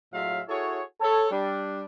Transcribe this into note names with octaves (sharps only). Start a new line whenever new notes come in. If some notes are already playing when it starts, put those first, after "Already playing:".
A2 F#3 G#3 F4 E5 F5
E4 F#4 G#4 A4 C#5
A4 C#5
G3 D4